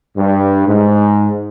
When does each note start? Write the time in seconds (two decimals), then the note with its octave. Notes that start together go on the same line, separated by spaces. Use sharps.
0.17 G2
0.67 G#2